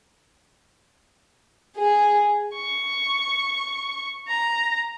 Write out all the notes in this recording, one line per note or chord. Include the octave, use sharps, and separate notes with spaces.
G#4
C#6
A#5